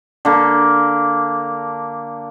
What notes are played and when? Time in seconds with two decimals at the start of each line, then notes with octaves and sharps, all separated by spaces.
0.25 D3 A#3